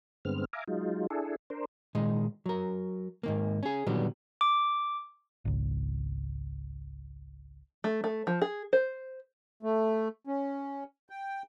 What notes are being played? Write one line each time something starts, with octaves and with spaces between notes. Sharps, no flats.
G2 D3 G#3 B3 C4 F6
E5 F5 G#5 A#5 D6
F#3 G#3 D#4 F4
D4 E4 G#4 A4
D4 A#4 C5
A#2 D#3 G#3 D#4
F#3 A#4
G#2 D#3 A#3
C#4 G#4
A#2 D3 D#3 F#3 G3 B3
D6
G#1 C#2
A3
A3
F3
G#4
C5
A3
C#4
G5